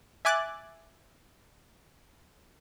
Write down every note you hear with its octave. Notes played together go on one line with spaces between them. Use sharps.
E5 G#5 D6 F#6 A6